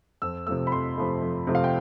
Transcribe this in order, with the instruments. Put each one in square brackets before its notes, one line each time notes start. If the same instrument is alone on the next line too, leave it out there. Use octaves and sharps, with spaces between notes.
[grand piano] F2 E6
C3 F3 A3 E6
B5
F2 C6
C3 F3 A3
F2
C3 F3 A3
F5
G5